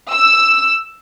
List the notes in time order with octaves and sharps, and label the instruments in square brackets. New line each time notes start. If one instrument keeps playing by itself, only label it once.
[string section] E6